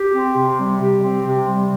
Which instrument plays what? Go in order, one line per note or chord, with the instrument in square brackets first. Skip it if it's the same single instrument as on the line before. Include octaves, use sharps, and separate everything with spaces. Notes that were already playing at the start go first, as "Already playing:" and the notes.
Already playing: [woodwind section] G4
C4
C3
G3
G4
C4
C3
G3